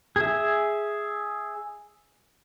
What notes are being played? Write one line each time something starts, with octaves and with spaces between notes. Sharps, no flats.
G#4 E5